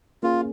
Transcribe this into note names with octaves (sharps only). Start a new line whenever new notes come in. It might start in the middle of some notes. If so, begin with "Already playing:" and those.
A#3 C#4 F4 G#4